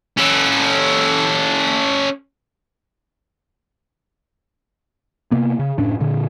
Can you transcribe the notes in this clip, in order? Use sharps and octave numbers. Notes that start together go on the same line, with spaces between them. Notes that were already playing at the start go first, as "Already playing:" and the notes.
C#4 A4
C3 A#3 B3
C#3
F#1 A2 C#4 D4
A#2 D3